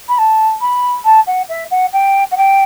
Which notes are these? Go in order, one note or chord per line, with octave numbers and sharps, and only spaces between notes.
B5
A5
B5
A5
F#5
E5
F#5
G5
F#5
G5